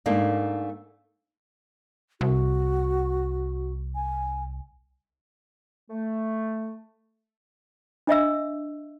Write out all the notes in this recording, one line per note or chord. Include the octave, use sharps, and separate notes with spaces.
G#2 A3 A#3 D4
C2 F#4
G#5
A3
D4 D#5 E5 E6